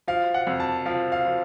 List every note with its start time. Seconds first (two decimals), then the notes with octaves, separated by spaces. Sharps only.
0.08 F3 F5
0.34 F#5
0.47 F2
0.60 A5
0.86 F3 F5
1.12 F5
1.25 F3